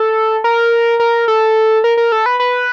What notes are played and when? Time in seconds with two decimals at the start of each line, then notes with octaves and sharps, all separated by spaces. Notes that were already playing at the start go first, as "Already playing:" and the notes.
Already playing: A4
0.44 A#4
1.00 A#4
1.28 A4
1.84 A#4
1.97 A#4
2.12 A4
2.26 B4
2.40 B4